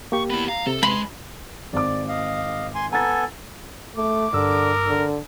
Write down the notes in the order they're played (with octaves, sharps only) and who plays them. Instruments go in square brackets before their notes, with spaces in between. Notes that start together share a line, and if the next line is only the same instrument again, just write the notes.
[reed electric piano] A#3 G4 [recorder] C#6
[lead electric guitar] B3 E4 [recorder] B5
[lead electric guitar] F5 [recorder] A#5
[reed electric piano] C3 [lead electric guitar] A4
[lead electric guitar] G#3 [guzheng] B5 [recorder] C6
[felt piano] G#1 D6 [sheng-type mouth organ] D5
[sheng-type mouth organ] D#5 F5
G#5 C6
[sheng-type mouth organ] B3 A4 G#5 [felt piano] A#5 A6
[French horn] A3 [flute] D6
[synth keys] G2 E6 [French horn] D3 [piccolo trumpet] A#4
[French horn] D3